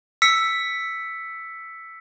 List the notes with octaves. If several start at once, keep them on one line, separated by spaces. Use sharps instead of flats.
E6 B6 C#7